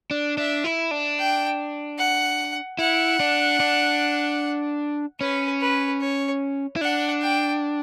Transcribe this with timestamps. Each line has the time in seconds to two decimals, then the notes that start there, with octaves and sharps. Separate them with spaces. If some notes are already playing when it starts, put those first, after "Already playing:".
0.11 D4
0.38 D4 E5
0.64 E4
0.91 D4
1.19 G5
1.98 F#5
2.79 E4 F#5
3.20 D4
3.60 D4
5.20 C#4 B4
5.61 B4
6.01 C#5
6.76 E4
6.81 D4 F#5
7.22 G5